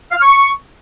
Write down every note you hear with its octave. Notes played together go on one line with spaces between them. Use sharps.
F5
F6
C#6